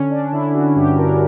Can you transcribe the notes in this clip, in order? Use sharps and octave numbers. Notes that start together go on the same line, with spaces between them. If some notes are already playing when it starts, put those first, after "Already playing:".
Already playing: D3 C#4
D4
D3 E4
F#4
G2 G4
A#4